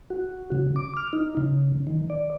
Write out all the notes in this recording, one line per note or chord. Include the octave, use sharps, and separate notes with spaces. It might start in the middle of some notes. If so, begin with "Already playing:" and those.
F#4
C#3
D6
F6
D#4
C#3
D#3
D5